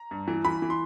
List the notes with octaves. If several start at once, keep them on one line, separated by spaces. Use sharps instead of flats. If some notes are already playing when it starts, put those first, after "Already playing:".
Already playing: A#5
G2
E3
E3 B5
E3
C6